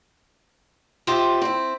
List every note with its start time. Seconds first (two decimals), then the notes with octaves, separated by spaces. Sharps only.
1.07 F4 G4 C5 D#5 E5
1.41 C4 E4